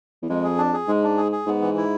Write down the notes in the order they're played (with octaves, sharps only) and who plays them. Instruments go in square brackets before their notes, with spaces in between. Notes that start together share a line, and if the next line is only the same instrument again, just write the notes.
[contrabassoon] E2
[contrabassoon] F2 [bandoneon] G#3
[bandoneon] G#4
D4
G#4
[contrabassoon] G#2 [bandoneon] G#3
[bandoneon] D4
G#4
G#4
[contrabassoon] G#2 [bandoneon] B3
[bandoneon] E3
E4